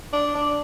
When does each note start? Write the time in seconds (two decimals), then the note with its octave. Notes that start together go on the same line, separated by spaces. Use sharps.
0.13 D4
0.35 D4